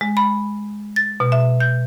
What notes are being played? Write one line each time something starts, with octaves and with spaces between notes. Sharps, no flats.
G#3
B5
A6
B2
E5
G6